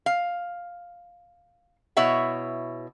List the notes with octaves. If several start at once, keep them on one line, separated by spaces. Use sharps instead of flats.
F5
B2 E4 C#5 E5 F#5